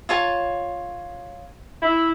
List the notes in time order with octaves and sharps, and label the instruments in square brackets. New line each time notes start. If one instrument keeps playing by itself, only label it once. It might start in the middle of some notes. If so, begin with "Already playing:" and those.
[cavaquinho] F4 C#5 A5
[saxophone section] E4